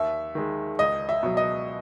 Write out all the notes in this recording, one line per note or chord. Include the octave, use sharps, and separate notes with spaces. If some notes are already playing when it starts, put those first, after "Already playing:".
Already playing: D#2 E5
D#3 G#3
C#2 D#5
E5
B2 F#3
D#5